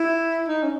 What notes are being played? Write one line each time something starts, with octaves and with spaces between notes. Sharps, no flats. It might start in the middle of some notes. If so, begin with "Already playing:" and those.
Already playing: E4
D#4
C#4